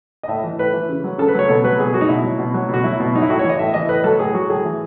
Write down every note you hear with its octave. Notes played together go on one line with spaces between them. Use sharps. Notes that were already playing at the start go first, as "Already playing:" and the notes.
D#5
A2 E5
E3
A2 B4
E3
C#3
F#3
C#3 A4
B4
F#3 C#5
B2 A4
F#3 B4
B2 G#4
F#3 F#4
D#4
B2 E4
F#3
B2
F#3
B2
F#4
F#3 E4
B2
F#3 D#4
E4
A2 F#4
E3 C#5
D#5
A2 E5
E3 D#5
A2 B4
F#3 A4
A2 G#4
F#3 F#4
A2 G#4
E3